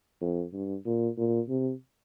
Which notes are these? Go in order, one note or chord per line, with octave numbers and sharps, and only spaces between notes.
F2
G2
A#2
A#2
C3